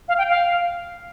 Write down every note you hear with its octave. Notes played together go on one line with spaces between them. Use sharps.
F5
G5
F5